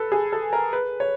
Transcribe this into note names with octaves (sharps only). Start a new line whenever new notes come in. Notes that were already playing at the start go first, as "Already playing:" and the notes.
Already playing: A4 B4
G#4
A4
A#4
B4
C#5